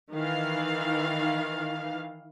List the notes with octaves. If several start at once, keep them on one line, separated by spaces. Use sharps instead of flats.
D#3 E3 F5